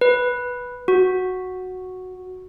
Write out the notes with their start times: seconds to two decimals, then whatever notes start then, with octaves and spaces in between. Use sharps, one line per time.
0.01 B4
0.88 F#4